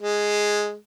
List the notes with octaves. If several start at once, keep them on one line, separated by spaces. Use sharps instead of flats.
G#3